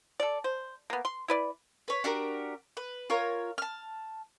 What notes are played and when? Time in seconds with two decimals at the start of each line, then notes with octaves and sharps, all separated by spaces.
0.20 A4 D5
0.44 C5
0.90 A#3 B3
1.05 C6
1.28 E4 B4 D5
1.88 B4 C#5
2.04 D4 F#4 G4 A#4
2.77 B4
3.10 F4 A#4 C#5
3.58 A5 F6